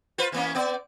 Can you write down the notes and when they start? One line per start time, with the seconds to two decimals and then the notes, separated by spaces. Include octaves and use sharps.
0.18 F4 B4 C5
0.32 E3 A#3 C#4
0.55 B3 D5